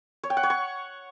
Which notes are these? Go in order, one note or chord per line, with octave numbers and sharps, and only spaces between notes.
C#5
G5
F#5
C#5
C#6